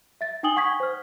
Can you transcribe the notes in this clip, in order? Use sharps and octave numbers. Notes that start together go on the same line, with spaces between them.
E5 A6
D#4 G5 G#5 D#6 F#7 G7
F#5 C#6 D#6 G#6 B6
C5 F6